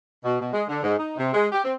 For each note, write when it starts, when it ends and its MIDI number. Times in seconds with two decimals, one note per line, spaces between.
0.25 0.39 47
0.40 0.53 47
0.53 0.63 56
0.69 0.80 50
0.83 0.95 44
0.98 1.16 63
1.17 1.30 48
1.34 1.47 56
1.52 1.63 67
1.64 1.74 60